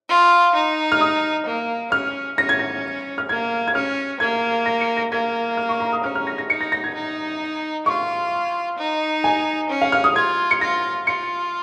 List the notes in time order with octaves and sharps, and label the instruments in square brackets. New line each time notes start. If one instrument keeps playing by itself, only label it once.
[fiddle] F4
D#4
[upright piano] F6
D#6
[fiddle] A#3
[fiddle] C#4 [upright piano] F6
[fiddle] C#4 [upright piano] A#6
[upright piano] G#6
A#6
F6
[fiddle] A#3 [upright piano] G#6
[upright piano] G#6
[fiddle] C#4 [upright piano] F6
[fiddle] A#3 [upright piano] G#6
[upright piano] A#6
C#7
A#6
[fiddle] A#3 [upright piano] G#6
[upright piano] F6
C#6
A#5
D#6
[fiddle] C#4 [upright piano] F6
[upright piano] F6
A#6
A#6
[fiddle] D#4 [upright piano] C#7
[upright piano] A#6
A#6
G#6
[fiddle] D#4
[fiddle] F4 [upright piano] C#6
[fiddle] D#4
[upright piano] G#5
[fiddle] C#4
[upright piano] F5
F6
D#6
[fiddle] F4 [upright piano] G#6
[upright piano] C#7
[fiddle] F4 [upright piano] A#6
[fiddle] F4 [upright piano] C#7